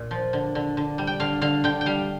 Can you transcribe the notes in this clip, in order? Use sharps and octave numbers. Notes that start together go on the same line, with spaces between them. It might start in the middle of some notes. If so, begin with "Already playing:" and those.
Already playing: A#2
F3
D3
D3
D3
G3
G5
D3 F5
D3 F5
D3 G5
G5
G3 F5